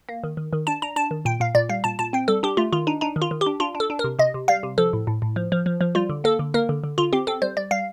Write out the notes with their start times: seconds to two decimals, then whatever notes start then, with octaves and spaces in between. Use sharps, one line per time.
0.09 A#3
0.24 D#3
0.37 D#3
0.53 D#3
0.67 D4 A5
0.82 D4 A#5
0.96 D4 A5
1.11 D#3
1.25 A#2 G5
1.40 A#2 F5
1.55 A#2 D5
1.69 G3 F5
1.84 A#2 A5
1.99 A#2 A5
2.13 C4 G5
2.28 G3 A4
2.43 D4 G4
2.57 A3 F4
2.73 D#3 F4
2.87 D4 D#4
3.01 D4 D#4
3.16 D#3
3.22 F4
3.31 D#3
3.41 G4
3.46 D4
3.60 D4 F4
3.75 D4
3.80 A4
3.90 D4
3.99 A#4
4.04 C3
4.19 C3 D#5
4.34 C3
4.48 G3 F5
4.63 C3
4.78 F3 A4
4.93 A2
5.07 A2
5.22 A2
5.36 F3
5.52 F3
5.66 F3
5.81 F3
5.95 G3 F4
6.09 D3
6.24 A#3 A4
6.39 D3
6.54 A#3 A#4
6.69 D3
6.84 D3
6.98 D3 F4
7.13 C4 G4
7.27 C4 A4
7.42 G3 C5
7.57 G3 D5
7.71 G3 F5